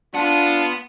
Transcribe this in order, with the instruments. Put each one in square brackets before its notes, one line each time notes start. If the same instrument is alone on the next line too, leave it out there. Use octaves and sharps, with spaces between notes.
[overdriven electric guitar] B3 [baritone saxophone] D4 [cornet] F4